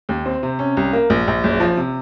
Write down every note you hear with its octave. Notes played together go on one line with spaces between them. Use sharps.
D#2
C4
C3
C#4
C2
A#3
A#1
A#1
F#1
F3
C3